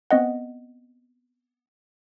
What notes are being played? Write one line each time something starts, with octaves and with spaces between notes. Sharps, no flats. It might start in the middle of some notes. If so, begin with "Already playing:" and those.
B3 C4 D#5 F#5